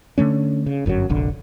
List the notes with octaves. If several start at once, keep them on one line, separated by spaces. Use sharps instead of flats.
D3 E3 A3 C#4
C#3
G1 F#2 D3 F#3
F1 A#1 D3